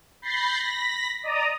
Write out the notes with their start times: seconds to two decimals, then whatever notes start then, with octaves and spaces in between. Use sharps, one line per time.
0.22 B5 G6 A6 A#6 C7
0.59 B5 A#6 B6
1.22 D5 D#5 A#5 D#6